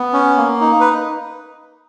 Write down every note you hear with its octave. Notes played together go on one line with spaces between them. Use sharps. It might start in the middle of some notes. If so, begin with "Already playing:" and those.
Already playing: B3
C#4
A#3
D#4
B4